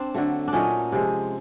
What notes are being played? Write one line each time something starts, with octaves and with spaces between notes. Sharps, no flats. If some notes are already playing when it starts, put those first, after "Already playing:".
Already playing: C4 D4
D3 F#3 A3
D4
A#2 F#3 A3 C#4 D#4
C3 F3 G#3